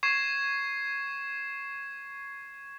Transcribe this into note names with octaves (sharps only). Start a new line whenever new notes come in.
C#6 G#6 C7 E7